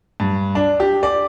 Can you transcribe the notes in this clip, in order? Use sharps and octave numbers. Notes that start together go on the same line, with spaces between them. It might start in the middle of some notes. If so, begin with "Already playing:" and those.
G2
D4
G4
D5